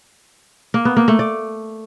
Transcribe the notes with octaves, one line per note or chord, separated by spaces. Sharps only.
A#3
B3
A#3
A3
D5